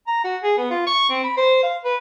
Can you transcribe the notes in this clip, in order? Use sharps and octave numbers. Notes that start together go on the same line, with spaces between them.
A#5
F#4
G#4
B3
F4
C#6
C4
B5
C5
F5
B4